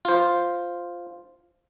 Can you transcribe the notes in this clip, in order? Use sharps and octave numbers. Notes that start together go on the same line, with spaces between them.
F4 C5